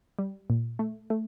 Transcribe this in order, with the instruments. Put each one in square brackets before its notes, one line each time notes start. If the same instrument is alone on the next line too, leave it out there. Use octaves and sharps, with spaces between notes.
[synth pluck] G3
A#2
A3
A3